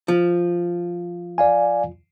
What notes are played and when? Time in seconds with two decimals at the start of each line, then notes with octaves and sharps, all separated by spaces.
0.08 F3
1.38 D5 F5 G#5